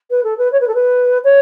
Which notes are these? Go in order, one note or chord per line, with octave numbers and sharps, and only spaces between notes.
B4
A4
B4
C#5
B4
A4
B4
C#5